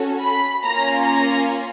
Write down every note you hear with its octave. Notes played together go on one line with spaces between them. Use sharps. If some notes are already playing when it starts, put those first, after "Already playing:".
Already playing: C#4 F#4 A4
B5
A#3 C#4 F4 A#5
A#5